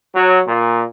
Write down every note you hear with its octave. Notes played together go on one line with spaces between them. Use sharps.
F#3
A#2